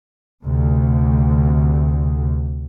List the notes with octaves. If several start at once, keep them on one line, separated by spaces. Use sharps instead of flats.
D2 C3